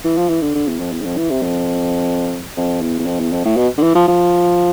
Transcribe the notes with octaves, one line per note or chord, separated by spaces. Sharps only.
E3
F3
E3
D3
D3
E2
F2
E2
G#2
F2
E3
C3
F2
F2
E2
E2
F2
E2
F2
A2
B2
D3
E3
F3
F3